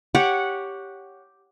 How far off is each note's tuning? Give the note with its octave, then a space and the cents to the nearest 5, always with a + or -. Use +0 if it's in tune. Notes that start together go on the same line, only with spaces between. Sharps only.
G4 +0 C#5 +5 F#5 -10